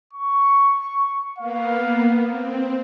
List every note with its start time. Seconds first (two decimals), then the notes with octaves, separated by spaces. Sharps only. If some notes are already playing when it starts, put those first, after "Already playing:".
0.13 C#6
1.38 A#3 B3 F5
2.25 C4